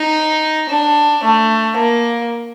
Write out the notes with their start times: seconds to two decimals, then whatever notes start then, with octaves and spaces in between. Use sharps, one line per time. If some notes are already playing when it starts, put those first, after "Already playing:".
Already playing: D#4
0.69 D4
1.23 A3
1.76 A#3